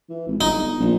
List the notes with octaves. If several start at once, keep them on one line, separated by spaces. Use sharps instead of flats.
E3
G#1
G1 D#4
A#1